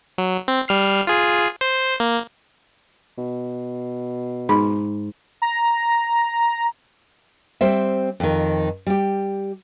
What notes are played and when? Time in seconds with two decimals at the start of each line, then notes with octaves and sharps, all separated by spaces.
0.18 F#3
0.48 C4
0.68 G3 F6 C7
1.07 F4 G#4
1.61 C5
2.00 A#3
3.18 B2
4.49 G#2 D#4 B5
5.42 A#5
7.61 G3 C4 C5 E5
8.20 F2 D#3
8.87 G3 G4